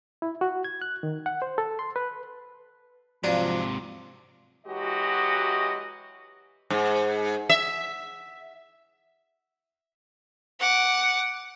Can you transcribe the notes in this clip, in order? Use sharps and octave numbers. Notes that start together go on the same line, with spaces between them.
E4
F#4
G#6
F#6
D#3
F#5
C5
A4
C6
B4
G#2 C3 F3 F#3 D4 D5 F5
E3 F#3 G#3 F#4 G4 D#5
G#2
E5
F#5 D6